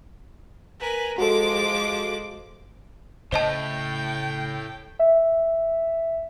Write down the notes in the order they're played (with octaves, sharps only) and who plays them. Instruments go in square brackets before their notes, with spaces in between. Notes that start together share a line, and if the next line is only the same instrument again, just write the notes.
[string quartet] A#4 B4 G#5
[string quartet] F3 G#3 D6 [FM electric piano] F#4 A4
[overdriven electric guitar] A2 [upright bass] C#3 [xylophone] C5 D#5 A5 [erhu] G5
[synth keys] E5